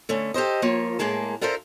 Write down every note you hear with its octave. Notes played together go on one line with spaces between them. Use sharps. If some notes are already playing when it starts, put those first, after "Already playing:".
D3 A3 C#4
G4 A4 C5 D#5
F3 A#3 F4 C#5
A2 G#3 A#3 G#4 A5
D4 F4 A4 A#4 C5 E5